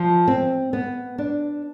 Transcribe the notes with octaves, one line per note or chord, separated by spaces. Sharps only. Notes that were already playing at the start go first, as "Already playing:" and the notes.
Already playing: F3
C4
B3
D4